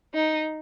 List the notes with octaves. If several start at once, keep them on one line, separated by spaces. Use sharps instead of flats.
D#4